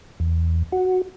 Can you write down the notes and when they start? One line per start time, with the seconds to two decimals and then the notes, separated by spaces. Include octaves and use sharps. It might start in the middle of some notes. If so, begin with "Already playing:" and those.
0.20 E2
0.72 F#4